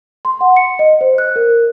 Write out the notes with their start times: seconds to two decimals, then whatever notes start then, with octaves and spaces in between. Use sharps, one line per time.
0.25 C6
0.41 F#5
0.56 C#7
0.79 D#5
1.01 C5
1.18 F#6
1.36 A#4